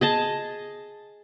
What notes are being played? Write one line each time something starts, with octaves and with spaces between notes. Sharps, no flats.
G#4 D#5 A5